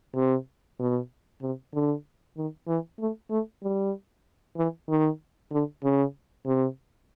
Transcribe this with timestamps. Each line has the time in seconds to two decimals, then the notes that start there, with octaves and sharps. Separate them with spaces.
0.15 C3
0.79 B2
1.42 C3
1.74 D3
2.37 D#3
2.68 E3
2.99 A3
3.30 A3
3.63 G3
4.57 E3
4.89 D#3
5.52 D3
5.84 C#3
6.46 C3